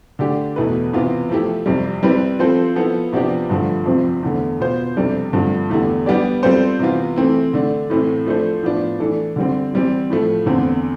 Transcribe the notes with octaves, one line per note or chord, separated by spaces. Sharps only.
D3 A3 D4 G4
E2 B2 A3 E4 B4
C3 E3 B3 F4
F3 A3 E4 G4
F2 C3 G3
G3 C4 E4 B4
F3 C4 F4 A4 C5
F3 B3 E4 A4
C3 F3 B3 D4 G4
G2 D3 F3 A3
F2 C3 F3 C4
E2 D3 A3
B2 B3 F4 C5
F2 C3 G3 D4 A4
G2 D3 F3 A3 C4
E2 D3 A3 E4 G4
G3 B3 D4 G4 D5
G3 C4 F4 A4 C5
C3 E3 B3 F4
E3 A3 C4 E4
D3 A3 D4
A2 E3 A3 C4 E4
F3 A3 D4 A4 C5
A2 F3 B3 D4 F4
E3 A3 D4 A4
D3 G3 C4
E3 G3 C4
A2 F3 A3
E2 D3 A3 C4